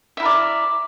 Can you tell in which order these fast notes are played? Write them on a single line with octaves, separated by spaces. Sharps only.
E5 E4 A#4 D5